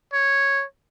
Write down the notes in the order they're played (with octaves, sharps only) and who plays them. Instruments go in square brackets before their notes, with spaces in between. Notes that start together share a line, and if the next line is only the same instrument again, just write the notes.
[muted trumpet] C#5